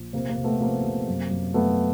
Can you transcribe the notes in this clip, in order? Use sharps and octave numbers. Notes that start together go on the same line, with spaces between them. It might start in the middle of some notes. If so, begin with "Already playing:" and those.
Already playing: A#1
C3 A#3 C4
A#3 C4
C3
A3 B3
F3 A#3 C4
C3
F#2
F#2
F#2 A3 B3